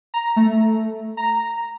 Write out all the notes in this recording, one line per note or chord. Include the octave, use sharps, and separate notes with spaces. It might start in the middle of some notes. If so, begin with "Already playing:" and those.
A#5
A3
A#5